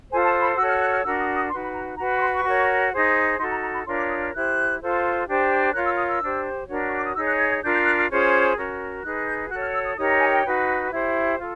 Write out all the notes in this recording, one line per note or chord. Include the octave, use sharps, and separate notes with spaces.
F4 A4 C5 G#5
A5
B5
F#4 A4 C#5 E6
F6
F#6
F6
D4 F#4 A#4 E6
D#6
D#6
D#4 F#4 B4 C6
B5
A#5
F#4 B4 A#5
B5
C#6
C6
C#6
F#4 A#4 C#5
D#4 G#4 C5
D#4 F#4 A4 C6
A#5
A#5
B5
D4 F4 A#4 C#5 C6
D6
D#6
F6
E4 G4 C5 F#6
F4 A4 C5
D4 G4 C5
F4 A#4 C#5 F#6
E6
D#6
E6
D4 G4 C5
D4 F#4 A#4 C#5
C#6
D6
D#6
D#4 G#4 C#5 E6
F#6
G#6
G#6
D4 F4 A#4 G6
G6
F#6
F6
C#4 F4 G#4 C5
C#4 F#4 A#4
D#4 G#4 B4 F#6
F#6
G6
F#4 A4 C#5 F#6
F6
E6
D#6
D#4 G4 A#4 C#5 D#6
A#5
G#5
G5
D#4 F#4 B4
E4 G4 C5
F4 A4